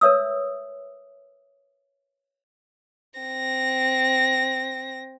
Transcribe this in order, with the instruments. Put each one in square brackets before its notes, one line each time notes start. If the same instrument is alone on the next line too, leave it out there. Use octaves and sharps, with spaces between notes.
[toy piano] A#4 B4 C#5 E5 D#6 E6
[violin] C4 A#6